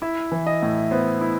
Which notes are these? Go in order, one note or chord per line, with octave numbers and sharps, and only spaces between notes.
E4 E5
E3
D#5
A2
B3 C5
E4